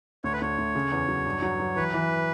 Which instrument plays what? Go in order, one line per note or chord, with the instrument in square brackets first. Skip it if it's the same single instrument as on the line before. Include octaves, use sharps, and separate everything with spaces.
[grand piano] D2 [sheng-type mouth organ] C#5
[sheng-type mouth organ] B4
[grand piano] D2 [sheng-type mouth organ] C#5
[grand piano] D2
C#3
E2
F#3
G2
F#3
F#3
[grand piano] E3 [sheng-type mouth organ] B4
[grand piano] E3